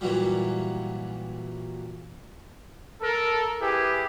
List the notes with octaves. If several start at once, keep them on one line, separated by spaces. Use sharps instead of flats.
A#2 E3 F#3 G3
A4 A#4
E4 G4 G#4 B4